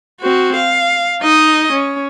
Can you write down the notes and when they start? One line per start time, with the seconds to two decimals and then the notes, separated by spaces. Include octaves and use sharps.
0.21 C4 F#4
0.56 F5
1.22 D#4 D#5
1.72 C#4